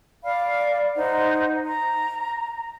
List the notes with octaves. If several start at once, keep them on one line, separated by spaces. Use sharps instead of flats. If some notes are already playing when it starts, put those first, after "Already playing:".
D5 F5 B5
D#4 C5 F#5
A#5